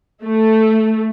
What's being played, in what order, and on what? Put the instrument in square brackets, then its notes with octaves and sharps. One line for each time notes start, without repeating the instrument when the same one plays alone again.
[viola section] A3